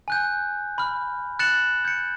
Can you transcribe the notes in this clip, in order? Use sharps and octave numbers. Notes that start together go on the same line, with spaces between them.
G#5 F#6 G6
B5 F6
F#6 A6 C#7 E7 F#7
G6 C#7